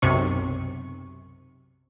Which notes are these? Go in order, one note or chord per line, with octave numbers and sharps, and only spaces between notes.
B1 F#2 C3 C#6